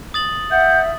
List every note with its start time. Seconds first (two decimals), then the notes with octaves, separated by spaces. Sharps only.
0.14 D#6 A6 F#7
0.51 E5 F#5 G6